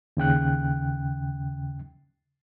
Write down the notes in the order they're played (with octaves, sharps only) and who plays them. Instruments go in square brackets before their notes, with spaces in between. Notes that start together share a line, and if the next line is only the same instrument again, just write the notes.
[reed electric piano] D#2 C#3 G5 F#6